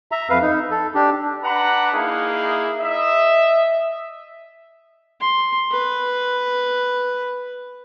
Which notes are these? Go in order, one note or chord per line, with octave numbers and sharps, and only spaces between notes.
E5 A#5
F2 B4 F5
D#4
A4
D4 G4
D4 B4 F#5 A#5 B5
A#3 D#4 E4 G#4
D#5 E5
C6
B4